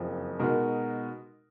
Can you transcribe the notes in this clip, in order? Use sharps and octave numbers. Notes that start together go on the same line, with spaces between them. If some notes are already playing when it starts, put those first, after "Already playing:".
Already playing: F#1 F2 F3
B2 G#3 D#4 F#4 A#4